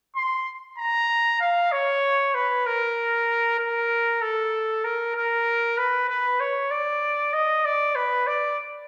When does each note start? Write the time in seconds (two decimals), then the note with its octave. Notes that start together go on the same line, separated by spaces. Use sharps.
0.16 C6
0.78 A#5
1.41 F5
1.72 C#5
2.35 B4
2.66 A#4
3.59 A#4
4.22 A4
4.84 A#4
5.15 A#4
5.78 B4
6.09 B4
6.40 C#5
6.71 D5
7.33 D#5
7.65 D5
7.96 B4
8.27 D5